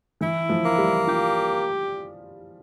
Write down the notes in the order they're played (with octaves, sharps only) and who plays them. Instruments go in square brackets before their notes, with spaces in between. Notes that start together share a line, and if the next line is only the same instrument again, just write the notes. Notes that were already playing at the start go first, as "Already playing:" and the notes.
[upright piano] E3 [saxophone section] E4
[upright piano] F3
[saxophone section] A#3
[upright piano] G3
[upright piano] F4 [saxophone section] G4